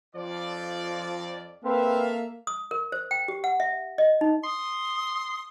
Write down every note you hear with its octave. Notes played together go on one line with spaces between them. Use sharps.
F2 F3 F4 D5
A#3 C4 A4 B4 E5 F5
D#6
A#4
C5
G5
G4
F#5
E5
D#5
D#4
C6 D#6